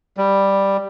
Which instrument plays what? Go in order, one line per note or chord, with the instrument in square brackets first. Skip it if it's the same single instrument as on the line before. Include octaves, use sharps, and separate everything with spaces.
[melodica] G3